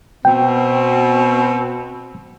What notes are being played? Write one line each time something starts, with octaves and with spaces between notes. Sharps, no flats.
B2 C4 G5